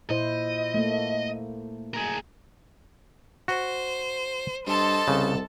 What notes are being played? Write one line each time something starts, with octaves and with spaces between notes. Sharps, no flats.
A#2 E4 C5 D#5
A3 A#3
G#4 A#4
F#4 C5
G2 A4 C5 D#5 A5
C2 C#3